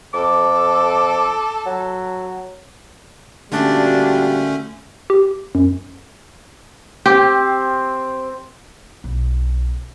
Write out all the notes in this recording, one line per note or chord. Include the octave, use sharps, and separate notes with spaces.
F2 A4 D6
F#3
A#2 D3 G3 A3 C#4 D4 F#4
G4
F#2
C4 G4
B1